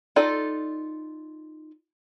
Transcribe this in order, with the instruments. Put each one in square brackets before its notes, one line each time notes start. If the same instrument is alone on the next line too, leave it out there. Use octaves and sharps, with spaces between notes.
[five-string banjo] D#4 F4 A4 D5